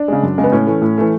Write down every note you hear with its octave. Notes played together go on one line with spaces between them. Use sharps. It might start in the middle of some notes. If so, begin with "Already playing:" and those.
Already playing: D4
C#3 G#3
F#2
C#3 G#3
B3
A2 C#4
E3 A3
A2
E3 A3